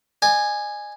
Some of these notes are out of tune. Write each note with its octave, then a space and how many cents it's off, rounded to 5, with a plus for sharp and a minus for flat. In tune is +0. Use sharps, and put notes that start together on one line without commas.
D5 +45 G#5 -5